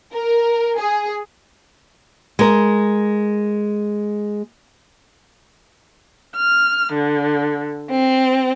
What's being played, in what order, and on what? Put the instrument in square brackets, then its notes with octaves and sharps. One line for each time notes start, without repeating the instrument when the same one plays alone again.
[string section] A#4
G#4
[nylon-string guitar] G#3 A#4
[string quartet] F6
D3
C4